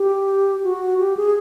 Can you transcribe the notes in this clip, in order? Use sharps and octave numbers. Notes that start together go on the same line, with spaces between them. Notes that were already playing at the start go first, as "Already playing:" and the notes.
Already playing: G4
F#4
G4
G#4